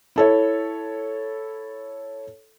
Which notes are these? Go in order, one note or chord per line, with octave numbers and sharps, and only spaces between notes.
E4 A4 C#5